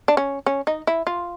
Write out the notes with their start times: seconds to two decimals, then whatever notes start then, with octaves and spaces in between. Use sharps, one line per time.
0.08 D4
0.17 C#4
0.46 C#4
0.67 D#4
0.87 E4
1.07 F4